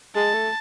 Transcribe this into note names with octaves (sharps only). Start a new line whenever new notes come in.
G#3 A5
A3